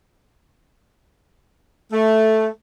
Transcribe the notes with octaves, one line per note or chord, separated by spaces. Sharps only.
A3